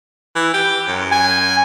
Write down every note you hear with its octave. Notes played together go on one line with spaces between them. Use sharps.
E3
G4
F#2
G#5